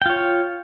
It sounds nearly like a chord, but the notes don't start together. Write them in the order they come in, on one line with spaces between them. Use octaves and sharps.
G5 F4 C#5